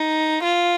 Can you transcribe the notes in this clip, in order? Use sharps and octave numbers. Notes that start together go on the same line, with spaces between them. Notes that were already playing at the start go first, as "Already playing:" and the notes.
Already playing: D#4
F4